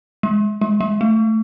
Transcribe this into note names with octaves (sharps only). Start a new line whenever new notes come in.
G#3
G#3
G#3
A3